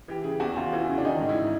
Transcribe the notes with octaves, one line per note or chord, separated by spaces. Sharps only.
E3 G4
C#3 G#4
E2 F#4
E2 F4
E3
C#3
D4
D#3 D#4
G#2
E4